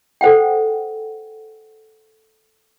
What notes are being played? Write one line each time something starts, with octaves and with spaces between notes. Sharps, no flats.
A4 C5 F#5 G5